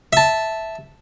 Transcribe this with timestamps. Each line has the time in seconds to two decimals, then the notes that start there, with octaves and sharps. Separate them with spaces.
0.13 E5 A5